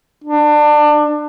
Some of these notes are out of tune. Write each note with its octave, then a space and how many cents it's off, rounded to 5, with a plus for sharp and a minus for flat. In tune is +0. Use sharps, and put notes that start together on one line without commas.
D4 +25